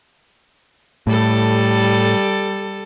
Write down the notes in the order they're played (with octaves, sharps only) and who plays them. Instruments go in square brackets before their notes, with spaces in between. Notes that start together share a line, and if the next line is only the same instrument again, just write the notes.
[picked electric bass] A2 [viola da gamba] G3 A4